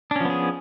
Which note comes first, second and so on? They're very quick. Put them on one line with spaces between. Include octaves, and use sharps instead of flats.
D4 C#4 F3 B3 G#4